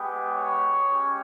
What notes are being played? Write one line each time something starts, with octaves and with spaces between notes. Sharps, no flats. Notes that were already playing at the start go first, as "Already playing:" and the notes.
Already playing: G#3 B3 G4
C#5
G#3 C#4 G4